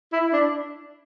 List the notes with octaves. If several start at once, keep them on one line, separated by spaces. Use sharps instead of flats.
E4
D4